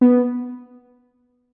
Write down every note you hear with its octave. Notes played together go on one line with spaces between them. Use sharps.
B3